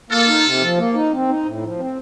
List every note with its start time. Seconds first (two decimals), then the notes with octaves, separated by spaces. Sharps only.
0.10 A#3 F4 A4
0.27 D#4
0.44 C3
0.61 F3
0.77 A#3
0.94 D#4
1.12 C4
1.28 D#4
1.45 A2
1.62 F3
1.79 C4